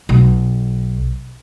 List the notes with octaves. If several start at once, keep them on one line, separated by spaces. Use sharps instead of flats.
B1